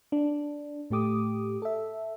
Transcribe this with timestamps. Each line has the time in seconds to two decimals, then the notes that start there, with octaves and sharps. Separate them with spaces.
0.12 D4
0.90 A2 A3 G4 D6 D#6
1.62 A4 E5